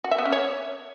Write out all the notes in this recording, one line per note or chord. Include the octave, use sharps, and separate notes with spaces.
F#4
E5
B3
C#4
C#5